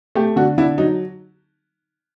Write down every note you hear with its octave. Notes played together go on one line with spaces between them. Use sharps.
A3 G4
D3 F#4
D3 E4
F#3 D#4